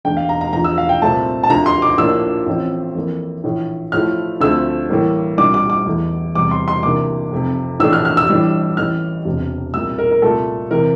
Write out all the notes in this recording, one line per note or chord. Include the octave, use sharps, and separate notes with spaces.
E2 D3 A3 D4 G5
F5
A#5
A#5
E2 D3 F3 A#5
E6
F5
G5
C2 A#2 A3 C4 A5
A5
D2 D3 F3 A#5
C6
D6
A#1 A2 F3 A#3 D4 E6
A1 A2 F3 C4
F2 E3 A#3
A#1 A2 E3
A2 F3 A3 E4 F6
D2 D3 F3 A3 C4 E6
A2 E3 G3 A#3
C2 A#2 G3 D4 D6
D6
D6
E2 E3 A3
E2 C3 G3 D6
C6
C6
C2 C3 E3 A#3 D4 D6
F1 F2 C3
A#1 A2 E3 A3 D4 E6
F6
F6
E6
A2 E3 G3 D4
A1 A2 E3 F6
E1 E2 C3
C2 A#2 G3 A#3 E6
A#4
A#4
C2 A#2 A3 A4
C3 E3 A#4